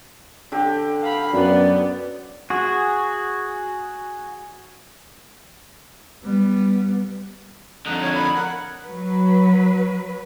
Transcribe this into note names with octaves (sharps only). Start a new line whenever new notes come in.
D3 G4
F5 B5
F#2 B3 D5
F#4 G#4
G3 B3
F2 D3 D#4 F#6
C#5 G#6
B5
A#4 F#5
F#3 B4